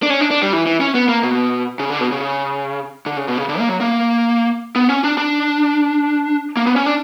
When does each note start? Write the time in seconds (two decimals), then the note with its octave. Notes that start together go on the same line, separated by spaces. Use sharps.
0.03 D4
0.10 C#4
0.21 D4
0.31 D4
0.43 G3
0.53 E3
0.66 E3
0.81 C#4
0.95 B3
1.08 A#3
1.23 B2
1.80 C#3
1.90 D3
2.00 B2
2.12 C#3
3.06 D3
3.17 C#3
3.28 B2
3.38 C#3
3.49 D3
3.59 A#3
3.69 F#3
3.81 A#3
4.76 B3
4.89 C#4
5.04 D4
5.17 D4
6.57 A#3
6.67 B3
6.76 C#4
6.86 D4